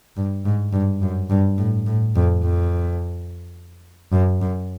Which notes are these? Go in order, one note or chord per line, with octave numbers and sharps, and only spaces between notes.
G2
G#2
G2
F#2
G2
A2
A2
F2
F2
F#2
F#2